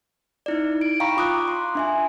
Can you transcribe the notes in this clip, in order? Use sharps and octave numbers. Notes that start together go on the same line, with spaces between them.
D#4 E4 D5
D7
F5 G5 A#5 B5 C#6
F4 D6 D#6 F#6
C6
D4 E5 G#5